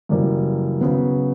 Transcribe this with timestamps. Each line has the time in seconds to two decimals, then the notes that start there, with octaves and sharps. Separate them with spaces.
0.09 F#2 C#3 E3 G3 A#3
0.81 C#3 F#3 B3